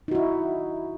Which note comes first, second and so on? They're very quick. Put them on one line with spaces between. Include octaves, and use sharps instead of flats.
D#4 F#4 E4